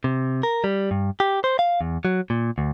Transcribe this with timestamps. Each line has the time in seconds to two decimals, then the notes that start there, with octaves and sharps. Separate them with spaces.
0.04 C3
0.43 A#4
0.64 G3
0.91 G2
1.20 G4
1.44 C5
1.59 F5
1.81 E2
2.05 F#3
2.30 A#2
2.58 D2